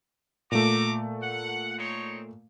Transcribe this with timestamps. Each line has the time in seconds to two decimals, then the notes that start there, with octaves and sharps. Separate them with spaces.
0.52 A#2 A3 F#4 A#5 D6
1.22 F#5
1.78 C4 D#4 C#5